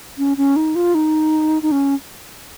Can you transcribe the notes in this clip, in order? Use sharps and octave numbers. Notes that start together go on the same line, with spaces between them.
C#4
C#4
D#4
F4
D#4
D#4
C#4